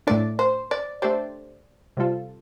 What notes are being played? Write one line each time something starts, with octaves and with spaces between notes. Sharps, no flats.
A2 A3 D4 D5
C5
D5
A3 D4 G4 C5 D5
C3 G3 F4 A4